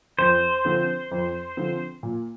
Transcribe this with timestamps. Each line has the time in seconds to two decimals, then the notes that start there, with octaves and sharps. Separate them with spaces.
0.19 F2 C5
0.65 D3 F3 C4
1.11 F2
1.57 D3 F3 C4
2.03 A#2